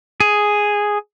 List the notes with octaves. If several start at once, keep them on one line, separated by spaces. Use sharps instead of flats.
G#4